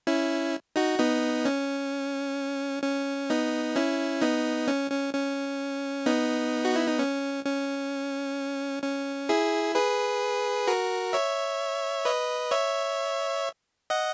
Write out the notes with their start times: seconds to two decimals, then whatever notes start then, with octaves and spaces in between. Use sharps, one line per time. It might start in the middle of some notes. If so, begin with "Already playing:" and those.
0.07 C#4 E4
0.76 D#4 F#4
0.99 B3 D#4
1.45 C#4
2.83 C#4
3.30 B3 D#4
3.76 C#4 E4
4.21 B3 D#4
4.68 C#4
4.91 C#4
5.14 C#4
6.06 B3 D#4
6.65 F#4
6.76 E4
6.87 D#4
6.99 C#4
7.45 C#4
8.83 C#4
9.29 E4 G#4
9.75 G#4 B4
10.67 F#4 A#4
11.13 C#5 E5
12.05 B4 D#5
12.51 C#5 E5
13.90 D#5 F#5